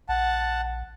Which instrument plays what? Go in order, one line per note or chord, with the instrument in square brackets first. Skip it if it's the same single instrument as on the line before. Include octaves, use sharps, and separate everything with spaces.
[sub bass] A#1 [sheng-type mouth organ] F#5 A5